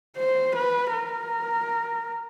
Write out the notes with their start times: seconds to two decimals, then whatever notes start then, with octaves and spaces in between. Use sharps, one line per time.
0.17 C5
0.55 B4
0.92 A#4